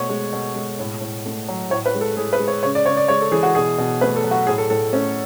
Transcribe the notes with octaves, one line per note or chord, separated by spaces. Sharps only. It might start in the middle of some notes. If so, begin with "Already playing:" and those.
Already playing: B2 A3 C#5
G#3
B2
G#3
A2
A2
A3
F#3
A2 C#5
B4
G#3
A4
A2 G#4
B4
G#3
C#5
C#3 C#5
D5
C#3 C#5
D5
G#3 C#5
A4
E3 G#4
F#4
B2 G#4
B2
A3 B4
A4
F#3
F#4
A2 G#4
A4
A2 A4
A3 C#4